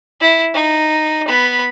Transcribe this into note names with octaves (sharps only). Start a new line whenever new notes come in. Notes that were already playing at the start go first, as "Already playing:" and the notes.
E4
D#4
B3 B5